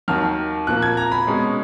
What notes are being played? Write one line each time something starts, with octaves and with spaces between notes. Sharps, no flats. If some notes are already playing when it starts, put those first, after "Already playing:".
D#2 D#3 F#3 F6
A#2 F3 A#3 F#6
G#6
A#5
B5
B2 G#3 C#4